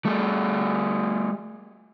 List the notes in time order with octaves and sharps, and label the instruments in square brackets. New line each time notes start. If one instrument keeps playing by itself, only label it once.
[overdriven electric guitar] G3 A3